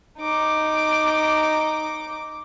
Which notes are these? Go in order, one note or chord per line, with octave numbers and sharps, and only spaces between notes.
D#4 D6